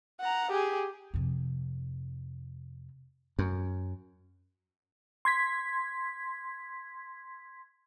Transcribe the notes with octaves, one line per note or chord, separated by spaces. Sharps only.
F#5 A#5
G4 G#4
F2 C3
F#2
C6 G#6 B6